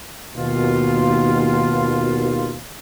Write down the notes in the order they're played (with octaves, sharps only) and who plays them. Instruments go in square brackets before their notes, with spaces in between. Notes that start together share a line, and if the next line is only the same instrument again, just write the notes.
[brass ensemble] D#2 B2 F4